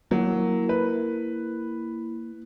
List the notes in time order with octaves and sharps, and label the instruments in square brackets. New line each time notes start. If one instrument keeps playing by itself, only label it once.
[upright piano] F#3 [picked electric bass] A#3 [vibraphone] E4
[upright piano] B4